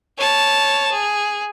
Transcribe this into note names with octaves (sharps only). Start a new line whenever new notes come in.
C#5 A5
G#4